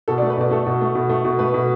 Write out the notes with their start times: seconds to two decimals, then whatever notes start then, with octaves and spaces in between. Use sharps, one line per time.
0.08 B2 A4
0.18 D5
0.22 A3
0.30 B4
0.37 B2 D5
0.51 A3 A4
0.66 B2
0.81 A3
0.95 B2
1.10 A3
1.24 B2
1.39 A3 B4
1.54 B2